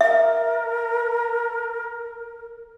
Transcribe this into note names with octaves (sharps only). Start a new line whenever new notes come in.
A#4 E5